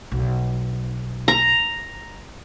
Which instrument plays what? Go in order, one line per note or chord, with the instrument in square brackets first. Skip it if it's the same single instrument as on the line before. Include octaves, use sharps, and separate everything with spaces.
[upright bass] B1
[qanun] A#5